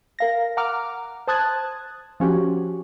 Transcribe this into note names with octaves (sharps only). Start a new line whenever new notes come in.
A#4 F5 A#6
F#5 A#5 D6 F6
C5 A5 D#6 F#6 G#6 A6
F3 C#4 F#4 G4